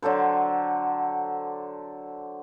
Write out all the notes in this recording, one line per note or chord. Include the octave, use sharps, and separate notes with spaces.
D3 F#3 A4 C5